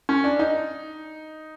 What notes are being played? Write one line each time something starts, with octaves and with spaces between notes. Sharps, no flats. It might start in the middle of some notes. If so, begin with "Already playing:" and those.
C#4
D4
D#4